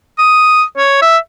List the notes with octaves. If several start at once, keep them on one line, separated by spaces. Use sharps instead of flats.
D#6
C#5
E5